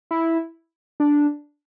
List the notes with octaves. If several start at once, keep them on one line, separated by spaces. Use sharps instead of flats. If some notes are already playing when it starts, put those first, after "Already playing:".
E4
D4